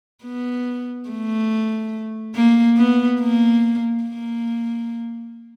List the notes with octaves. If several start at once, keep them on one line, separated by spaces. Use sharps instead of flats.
B3
A3
A#3
B3
A#3
A#3